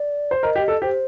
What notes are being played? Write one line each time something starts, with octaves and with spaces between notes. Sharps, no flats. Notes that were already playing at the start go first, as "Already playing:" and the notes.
Already playing: D5
C5
A#4 D#5
G4
A4
G4 C5